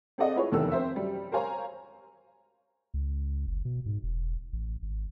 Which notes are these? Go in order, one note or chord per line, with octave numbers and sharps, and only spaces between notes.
C4 G#4 A4 D5 D#5 F#5
E4 F4 G#4 B4 C#5
F1 E2 D#3 A4 E6
C4 A#4 C5 E5
F#2 G3
A#4 C5 C#5 F5 G#5 A#5
C#2
F#1
B2
G#2
E1
A1
G#1